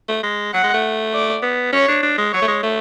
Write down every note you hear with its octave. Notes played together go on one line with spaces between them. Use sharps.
A3
G#3
F#3 F#5
G#3
A3
D5
B3
C#4 C#5
D4
D4
G#3
F#3 C#5
A3
G#3
A3